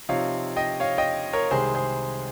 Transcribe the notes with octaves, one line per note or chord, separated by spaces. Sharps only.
C3 F3 C4 D#4 C#5 F5
D#5 G5
C#5 F5
D#5 G5
A#4 C#5
C2 C3 D#3 G#3 G#4 C5
G#4 C5